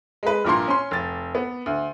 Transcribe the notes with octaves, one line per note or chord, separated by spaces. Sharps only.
G#3 B4
A#1 G2 A#2 A#3 A#4 C6
C#4 C6
F1 A6
B3
D2